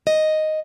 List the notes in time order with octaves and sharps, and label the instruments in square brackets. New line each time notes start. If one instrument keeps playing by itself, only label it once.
[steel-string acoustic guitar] D#5